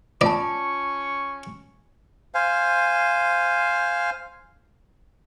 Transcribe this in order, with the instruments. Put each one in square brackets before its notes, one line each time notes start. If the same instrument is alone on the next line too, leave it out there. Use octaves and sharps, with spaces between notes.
[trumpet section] C#4 C#6 [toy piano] F4 A5 [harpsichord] D5
[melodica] C5 F5 G#5